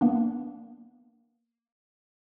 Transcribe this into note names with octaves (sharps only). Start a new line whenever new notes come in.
A#3 B3 D4